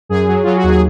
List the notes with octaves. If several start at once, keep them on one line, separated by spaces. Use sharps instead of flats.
F#2 G#4
F#3
F#3 F4
F#4
D#2
G#4